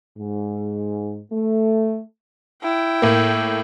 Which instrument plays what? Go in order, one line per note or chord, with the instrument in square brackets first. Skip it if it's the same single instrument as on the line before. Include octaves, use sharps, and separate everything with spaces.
[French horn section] G#2
A3
[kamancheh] E4 G5
[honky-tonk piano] A2 A#3